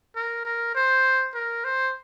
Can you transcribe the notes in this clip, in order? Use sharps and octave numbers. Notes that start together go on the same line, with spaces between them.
A#4
A#4
C5
A#4
C5